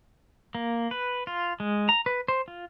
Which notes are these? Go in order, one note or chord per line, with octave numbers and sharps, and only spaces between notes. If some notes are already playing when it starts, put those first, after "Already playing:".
A#3
B4
F4
G#3
A#5
B4
C5
F4